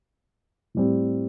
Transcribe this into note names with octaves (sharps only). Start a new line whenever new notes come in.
A2 G3 C4